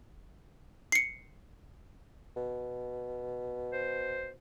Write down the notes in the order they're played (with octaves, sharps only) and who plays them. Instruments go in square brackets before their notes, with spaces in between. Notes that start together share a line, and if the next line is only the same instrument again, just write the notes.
[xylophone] C7 C#7
[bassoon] B2
[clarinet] C5